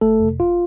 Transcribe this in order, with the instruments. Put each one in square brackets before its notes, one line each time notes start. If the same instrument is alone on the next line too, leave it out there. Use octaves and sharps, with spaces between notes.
[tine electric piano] G1 A3 A4
F2 C3
G1 F4